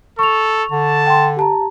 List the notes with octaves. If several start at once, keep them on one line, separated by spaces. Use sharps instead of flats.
A4 C#6 F7
D3 A5
G5 C6
G4 A5 A#5